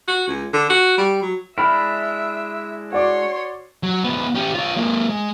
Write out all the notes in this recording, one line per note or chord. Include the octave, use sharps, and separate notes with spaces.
F#4
C#2
D3
F#4
G3
F#3
G#3 D4 E4 E5 B5 F6
F#4 C#5 D5 C6 D6
F#3
C#2 B3
C#4 G4
F4 C#5
G#3 A#3
G#3